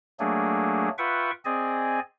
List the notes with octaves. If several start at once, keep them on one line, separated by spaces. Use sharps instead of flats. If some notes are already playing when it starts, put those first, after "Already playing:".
F#3 A3 A#3 D4 G#4
F4 B4 E5 F#5 G5 C#6
C4 G#4 D5 D#5 G#5